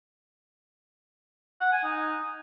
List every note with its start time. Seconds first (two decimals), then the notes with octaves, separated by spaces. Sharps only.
1.61 F#5
1.72 G#5
1.84 D#4